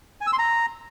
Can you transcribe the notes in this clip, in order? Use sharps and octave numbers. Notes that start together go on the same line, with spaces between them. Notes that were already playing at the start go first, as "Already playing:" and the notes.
G#5
E6
C6
A#5